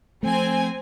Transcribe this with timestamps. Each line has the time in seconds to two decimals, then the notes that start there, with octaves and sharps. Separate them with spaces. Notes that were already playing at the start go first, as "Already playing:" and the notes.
0.23 F3 A3 C4 G#5